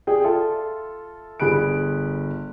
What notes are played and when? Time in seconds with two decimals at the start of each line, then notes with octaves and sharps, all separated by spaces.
0.07 G#4 D5 G5
0.24 F4 A4 E5
1.40 G1 G#4 B5 F#6 D7